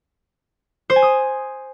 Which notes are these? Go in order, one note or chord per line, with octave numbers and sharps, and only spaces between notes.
C5
G#5
D#6